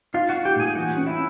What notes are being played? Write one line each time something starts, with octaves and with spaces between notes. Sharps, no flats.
D#4 F4 F5
F#4 F#5
D#4
G4 G5
A#2 G#4 G#5
E3 F#4 F#5
C#4
E4 E5